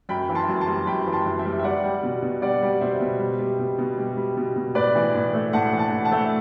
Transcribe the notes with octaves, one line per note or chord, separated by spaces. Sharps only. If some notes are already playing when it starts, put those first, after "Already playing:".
F#2 G5 B5
E3
A5 C6
F#2
A5 C6
G3
F#2 G5 B5
E3
A5 C6
F#2
E5 G5
G3
E5
G3 D5 F#5
G3
B2
B2
G3 D5 F#5
G3
B2 C5 E5
B2
G3
G3
B2
B2
G3
G3
B2
B2
A2 B4 D5
E3
A2
A3
A2 F#5 A5
E3
F#5 A5
A2
F#5 A5
A3